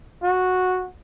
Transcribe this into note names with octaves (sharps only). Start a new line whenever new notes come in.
F#4